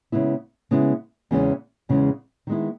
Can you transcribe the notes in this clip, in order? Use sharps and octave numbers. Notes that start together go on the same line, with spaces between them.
C#3 G#3 B3 E4
C#3 G#3 B3 E4
E2 C#3 E3 G#3 C#4
E2 C#3 E3 G#3 C#4
D#3 G#3 B3 E4